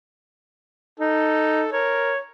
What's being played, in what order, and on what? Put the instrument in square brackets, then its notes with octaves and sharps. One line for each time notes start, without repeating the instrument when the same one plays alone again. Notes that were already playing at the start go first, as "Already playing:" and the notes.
[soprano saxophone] D#4 [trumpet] A4
[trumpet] A#4 [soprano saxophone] C#5